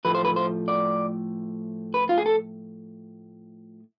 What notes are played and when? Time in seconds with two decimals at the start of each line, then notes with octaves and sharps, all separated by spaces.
0.05 A2 F3 A3 B4
0.15 C5
0.25 B4
0.36 C5
0.68 D5
1.94 B4
2.09 F4
2.18 G#4
2.26 A4